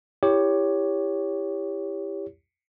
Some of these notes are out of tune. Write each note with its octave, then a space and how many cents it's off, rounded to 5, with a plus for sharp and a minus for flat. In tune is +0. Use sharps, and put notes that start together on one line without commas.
E4 +0 G4 +15 C#5 +15